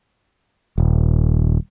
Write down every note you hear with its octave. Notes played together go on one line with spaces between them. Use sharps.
D#1